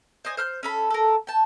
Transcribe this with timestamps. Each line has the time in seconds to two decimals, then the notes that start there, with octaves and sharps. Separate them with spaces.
0.25 C5 D5 D#5 G#5
0.37 C5 F6 G6
0.63 C#4 A4 B5
0.90 A4 A#4
1.27 G5 A5